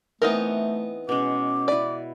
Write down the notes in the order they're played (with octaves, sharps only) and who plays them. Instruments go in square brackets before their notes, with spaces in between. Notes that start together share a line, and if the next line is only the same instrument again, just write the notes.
[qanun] E3 C4 G5 [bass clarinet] A3 [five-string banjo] B3 D#4 A#4
[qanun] B2 G#3 [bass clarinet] C#4 [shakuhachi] D6
[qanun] E4 B4 [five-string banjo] D5